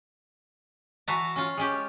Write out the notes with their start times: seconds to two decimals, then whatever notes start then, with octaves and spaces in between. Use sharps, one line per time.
1.08 E3 F#4 E5 A5 A#5
1.36 C#4 F4
1.57 G#3 C#4 G4